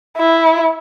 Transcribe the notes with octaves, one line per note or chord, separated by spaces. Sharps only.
E4